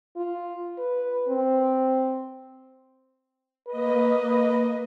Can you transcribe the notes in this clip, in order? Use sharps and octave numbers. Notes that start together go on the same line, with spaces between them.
F4
B4
C4
A#3 B4 D#5